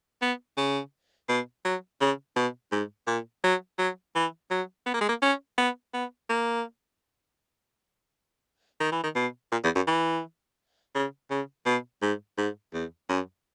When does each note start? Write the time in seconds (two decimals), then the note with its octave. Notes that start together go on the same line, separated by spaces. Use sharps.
0.22 B3
0.57 C#3
1.29 B2
1.64 F#3
2.01 C#3
2.36 B2
2.72 G#2
3.07 A#2
3.44 F#3
3.79 F#3
4.15 E3
4.51 F#3
4.86 B3
4.94 A#3
5.01 G#3
5.09 A#3
5.22 C#4
5.58 B3
5.94 B3
6.29 A#3
8.80 D#3
8.92 E3
9.03 D#3
9.15 B2
9.52 A#2
9.64 E2
9.75 F#2
9.87 E3
10.95 C#3
11.30 C#3
11.66 B2
12.02 G#2
12.38 G#2
12.73 E2
13.09 F#2